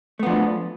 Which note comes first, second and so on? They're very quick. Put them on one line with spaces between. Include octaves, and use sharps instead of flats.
A3 B3 F3 D4